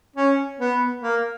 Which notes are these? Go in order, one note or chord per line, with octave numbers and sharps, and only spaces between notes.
C#4
B3
A#3